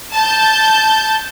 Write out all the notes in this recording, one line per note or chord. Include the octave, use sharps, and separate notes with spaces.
A5 G6